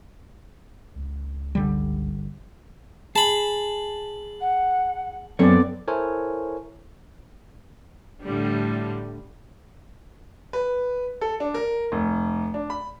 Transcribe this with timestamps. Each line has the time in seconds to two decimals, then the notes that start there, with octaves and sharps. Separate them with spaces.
0.96 C#2
1.55 G1 D3 G3
3.16 G#4 A5 B5
4.40 F#5
5.39 F#2 F#3 B3 C4 A4 C#5 D5
5.88 E4 A4 A#4 C5 C#5 G#5
8.22 A2 D3 G3
10.53 B4
11.21 A4
11.40 D4
11.54 A#4
11.92 F1
12.54 D4
12.70 B5